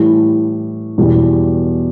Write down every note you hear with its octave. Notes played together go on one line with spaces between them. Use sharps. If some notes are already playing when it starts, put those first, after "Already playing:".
Already playing: A2 E3 G3
E2 B2 G3